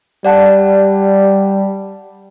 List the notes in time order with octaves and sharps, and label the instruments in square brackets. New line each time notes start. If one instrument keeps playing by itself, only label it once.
[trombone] G3 [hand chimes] D5 F#5 A5